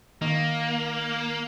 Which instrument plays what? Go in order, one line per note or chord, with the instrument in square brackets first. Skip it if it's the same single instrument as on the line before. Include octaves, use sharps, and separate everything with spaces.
[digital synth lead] D#3 [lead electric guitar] A#3